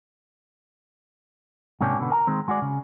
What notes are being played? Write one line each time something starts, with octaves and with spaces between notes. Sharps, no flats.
G#2 C3 A#3 C#4 D4 G4
B2 D3 B3
A#4 G#5 A#5
D#3 G#3 C4
G#3 F#4 G#4 D5
C#3